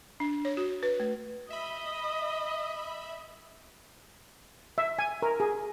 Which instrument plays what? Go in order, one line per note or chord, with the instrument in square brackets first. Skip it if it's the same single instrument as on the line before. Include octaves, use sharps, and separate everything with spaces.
[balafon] D4
C#5
F#4
B4
A3
[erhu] D#5 [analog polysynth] E5 B5
[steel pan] E5
G#5
A#4
G#4